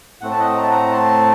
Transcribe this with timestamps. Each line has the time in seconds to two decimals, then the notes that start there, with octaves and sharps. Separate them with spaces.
0.21 A2 A3 C4 F#5
0.31 A5
0.39 D#5 F#5
0.57 A#5
0.63 A5
0.71 F#5 A#5
0.92 A5 C6